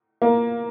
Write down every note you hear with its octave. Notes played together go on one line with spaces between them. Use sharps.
A#3